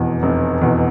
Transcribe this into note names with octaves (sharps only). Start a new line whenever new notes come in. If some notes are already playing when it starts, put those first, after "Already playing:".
Already playing: F1 E2 B2
F1
E2 B2